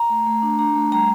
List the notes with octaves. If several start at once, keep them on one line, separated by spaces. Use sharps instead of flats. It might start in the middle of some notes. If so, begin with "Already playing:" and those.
Already playing: A#5
A3
A3
D4
D4 A#5
A3
G3 A#5